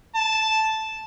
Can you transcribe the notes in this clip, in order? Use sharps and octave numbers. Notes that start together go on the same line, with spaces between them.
A5